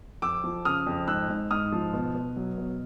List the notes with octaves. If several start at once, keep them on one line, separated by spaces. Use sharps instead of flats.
F2 D6 E6
F3
C#3 D#6 F6
F2
G#2 E6 F#6
G#2
G#2 D#6 F6
F3
B2
B2
F#3
B2